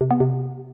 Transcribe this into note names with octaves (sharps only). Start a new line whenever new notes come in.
C3
B3
C3